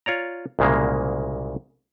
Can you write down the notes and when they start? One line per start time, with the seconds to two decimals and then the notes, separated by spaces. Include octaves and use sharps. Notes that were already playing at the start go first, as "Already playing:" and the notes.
0.06 F4 C#5 D5 A#5
0.59 C2 A#2 C#3 G#3 A#3